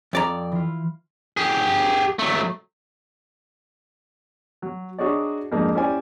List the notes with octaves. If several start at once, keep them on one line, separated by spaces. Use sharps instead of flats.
F2 D5 A#5
E3 F4
G4 G#4
F#3 A3
F#3
D4 D#4 F#4 G#4 C#5 D5
F2 G#2 A#3 D4 G#4
C#4 E4 G4 C5 D5 G#5